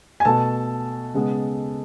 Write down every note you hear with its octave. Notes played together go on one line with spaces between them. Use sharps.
G#5
B2 A3 A4 A5
C#3 G#3 B3